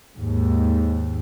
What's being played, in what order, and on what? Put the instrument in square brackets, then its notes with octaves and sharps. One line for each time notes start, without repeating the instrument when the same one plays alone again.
[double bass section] D#2 G#2